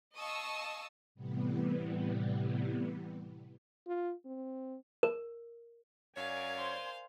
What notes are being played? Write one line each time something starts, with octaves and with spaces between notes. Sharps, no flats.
D#5 F5 A5 C#6 D#6 E6
A2 C3 E3 G3 B3
F4
C4
A#4
F#2 A#4 C#5 D5 F5 G#5
C5 C6